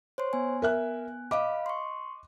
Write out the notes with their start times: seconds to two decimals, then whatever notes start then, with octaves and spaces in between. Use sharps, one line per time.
0.18 C5 C#5 C6
0.33 B3 G#5
0.62 A#4 E5 F#6
1.31 D#5 F5 B5 D6
1.66 C6 C#6